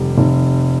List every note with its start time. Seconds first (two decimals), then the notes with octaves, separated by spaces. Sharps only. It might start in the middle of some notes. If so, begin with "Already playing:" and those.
Already playing: F1 D#2 G3
0.18 F1